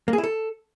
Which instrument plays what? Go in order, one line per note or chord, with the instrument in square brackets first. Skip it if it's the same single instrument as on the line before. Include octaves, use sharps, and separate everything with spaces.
[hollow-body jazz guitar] A#3
G#4
E4
A4